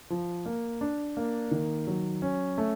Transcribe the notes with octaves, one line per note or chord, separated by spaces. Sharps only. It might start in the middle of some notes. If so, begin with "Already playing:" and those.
F3
A#3
D4
A#3
D#3
F#3
C#4
A3